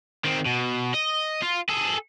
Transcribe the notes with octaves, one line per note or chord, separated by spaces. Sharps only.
D#3 C4
B2
D#5
F4
G#4 A4